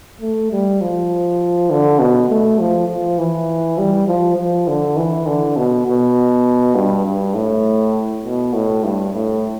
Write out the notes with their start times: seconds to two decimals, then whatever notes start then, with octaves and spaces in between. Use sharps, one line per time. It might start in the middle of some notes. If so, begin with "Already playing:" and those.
0.21 A3
0.52 G3
0.81 F3
1.70 D3
1.99 B2
2.30 A3
2.60 F3
2.89 F3
3.18 E3
3.78 G3
4.07 F3
4.37 F3
4.68 D3
4.97 E3
5.26 D3
5.57 B2
5.86 B2
6.76 G2
7.05 G2
7.34 A2
8.24 B2
8.53 A2
8.84 G2
9.13 A2